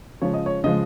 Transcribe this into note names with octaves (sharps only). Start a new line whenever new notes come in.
C#3 F3 G#3 C#5
D#5
C#5
C#3 F3 G#3 D#5